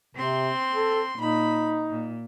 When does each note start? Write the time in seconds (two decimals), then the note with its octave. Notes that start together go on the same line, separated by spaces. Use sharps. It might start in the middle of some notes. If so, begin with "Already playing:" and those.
0.15 C3 C4 C6
0.74 A4
1.18 A#2 D#4 B5
1.89 A#2